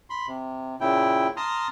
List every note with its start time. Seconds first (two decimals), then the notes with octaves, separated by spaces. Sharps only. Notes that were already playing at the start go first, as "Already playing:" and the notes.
0.10 B5 C6
0.27 C3
0.81 A#2 C#3 E4 G5
1.37 A5 A#5 C6 D#6 F6